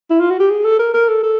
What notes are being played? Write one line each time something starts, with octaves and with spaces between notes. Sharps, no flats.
E4
F4
F#4
G4
G#4
A4
A#4
A#4
A4
A4